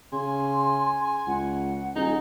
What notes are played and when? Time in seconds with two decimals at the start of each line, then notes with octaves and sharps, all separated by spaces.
0.12 C#3 G#5 C6
1.27 C#2 F#5
1.95 D#1 D#4 G#4